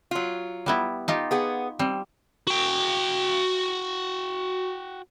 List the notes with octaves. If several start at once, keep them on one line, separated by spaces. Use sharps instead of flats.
F#3 F4
G3 B3 E4
D#4 F4 G4
B3 G#4 F#5
G3 C4
F#4 G5